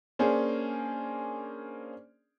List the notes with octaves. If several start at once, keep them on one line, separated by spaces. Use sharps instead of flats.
A#3 C#4 D4 G#4 C5